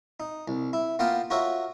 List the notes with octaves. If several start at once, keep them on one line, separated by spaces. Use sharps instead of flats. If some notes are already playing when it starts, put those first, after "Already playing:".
D#4
C2
E4
A#3 B3 F4 F5 G5 A5
F4 F#4 A#4 C#5 E5